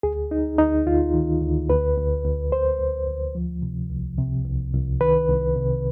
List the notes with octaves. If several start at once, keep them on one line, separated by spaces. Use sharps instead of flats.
D2 G#4
D2 D#4
D2 D#4
D2 F4
D#3
D2
D2 B4
D2
D2
D2 C5
D2
D2
F3
C3
C2
C3
C2
C2
D#3 B4
C2
C3